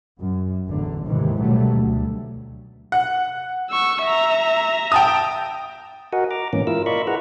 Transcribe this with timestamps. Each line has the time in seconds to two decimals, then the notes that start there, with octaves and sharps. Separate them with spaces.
0.20 F#2
0.67 A1 E2 D3
1.06 D#2 G#2 C3 D#3 E3
1.40 C#2 B2 F#3 G3 A3
1.72 D2
2.92 F#5
3.70 C#6 E6
4.02 E5 A#5
4.92 G5 A5 D#6
6.13 F#4 A#4 D#5 F#5 G#5
6.31 A#5 D6
6.53 G#2 E3 A#3 C#4
6.67 E4 F4 A#4 E6
6.86 F4 A#4 D5 D#5 B5 C#6
7.07 E4 G#4 B4 F#5 A#5